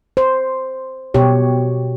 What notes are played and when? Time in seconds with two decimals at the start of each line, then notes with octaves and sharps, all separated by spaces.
0.17 C5
1.14 B2 G4 C#5